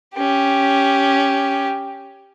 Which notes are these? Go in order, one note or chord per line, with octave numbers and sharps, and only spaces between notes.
C#4 G4